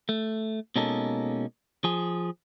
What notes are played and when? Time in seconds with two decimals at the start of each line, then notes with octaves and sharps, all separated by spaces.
0.09 A3
0.76 B2 G#3 A#3 C#4 D#4 A4
1.84 F3 G#4